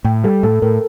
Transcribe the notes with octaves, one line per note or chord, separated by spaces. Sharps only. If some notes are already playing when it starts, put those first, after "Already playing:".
A2 G5
G3 A4
A2 A4
A2 A#4